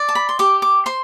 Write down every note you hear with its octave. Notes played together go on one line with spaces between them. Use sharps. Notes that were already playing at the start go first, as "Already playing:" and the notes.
Already playing: D5
A5
B5
C6
G4 D6
D6
C5 C6